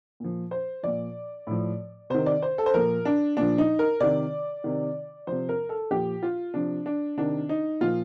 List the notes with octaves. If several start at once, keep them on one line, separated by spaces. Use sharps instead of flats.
A#2 F3
C5
A#2 F3 D5
A2 F3
C3 D#3 C5
D5
C5
A4
C5
A#2 F3 A#4
D4
A#2 F3 D4
D#4
A#4
C3 D#3 D5
C3 D#3
C3 F3 C5
A#4
A4
A#2 F3 G4
F4
C3 F3 D4
D4
C3 D#3 D4
D#4
A#2 F3 F4